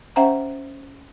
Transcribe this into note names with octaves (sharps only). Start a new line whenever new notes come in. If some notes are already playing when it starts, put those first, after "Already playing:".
C#4 C5 E5 F#5 G5 A#5